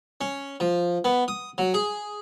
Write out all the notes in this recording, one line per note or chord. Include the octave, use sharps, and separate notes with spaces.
C#4
F3
B3
D#6
F#3
G#4